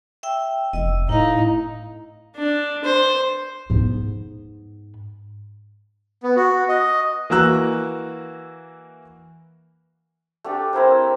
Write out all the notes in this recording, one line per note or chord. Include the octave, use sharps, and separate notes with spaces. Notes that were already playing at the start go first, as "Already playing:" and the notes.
E5 G5 E6
F1 D#5 E6
A2 D#4 E4 F5
D4
C5
G#2 B3
B3
F#4
D#5
E3 A#3 F#4 A#5 E6 F#6
A3 D4 G4 A4
C4 E4 A#4 C5